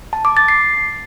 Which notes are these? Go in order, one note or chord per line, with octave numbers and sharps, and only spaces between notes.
A5
D6
A6
C7